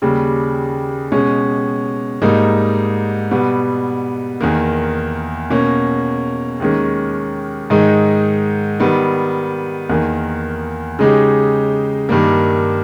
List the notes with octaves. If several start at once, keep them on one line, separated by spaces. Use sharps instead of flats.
D#2 C#3 G3
B2 G#3 C#4
G#2 G3 A#3 D#4
B2 G3 B3
E2 D#3 A#3
B2 A#3 C#4
D#2 D#3 G#3 C#4
G#2 D#3 G#3 D#4
D#3 G3 B3
E2 D#3 A#3
C#3 G#3 D#4 G4
G2 D#3 G3 A#3